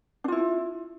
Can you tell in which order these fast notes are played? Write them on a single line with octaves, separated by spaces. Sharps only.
D4 F4 E4